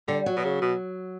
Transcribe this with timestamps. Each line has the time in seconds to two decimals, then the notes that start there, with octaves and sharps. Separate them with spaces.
0.08 D3 G3
0.26 F#3
0.37 B2
0.45 C#3
0.62 B2